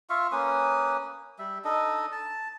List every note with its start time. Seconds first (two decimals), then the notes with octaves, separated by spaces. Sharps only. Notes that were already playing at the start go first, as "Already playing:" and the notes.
0.10 F4 E5 F5 C#6
0.32 A#3 C#4 B4 D#6
1.39 G3 E5
1.64 D4 D#4 A4 D#5
2.12 A5